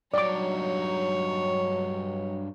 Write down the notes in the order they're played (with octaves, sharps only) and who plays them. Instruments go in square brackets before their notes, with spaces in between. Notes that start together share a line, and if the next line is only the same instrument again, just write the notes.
[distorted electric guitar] G2 D#4 [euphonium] F#3 [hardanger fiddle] C#5 [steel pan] D5 D6